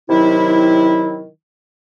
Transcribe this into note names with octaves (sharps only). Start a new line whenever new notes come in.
C3 D#3 F#3 E4